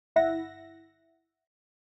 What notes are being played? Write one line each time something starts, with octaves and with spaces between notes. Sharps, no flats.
G1 E4 E5 F#5 A#6